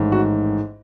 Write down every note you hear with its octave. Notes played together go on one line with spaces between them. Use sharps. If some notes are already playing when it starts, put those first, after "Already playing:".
Already playing: A1 G#2 D#3
F#4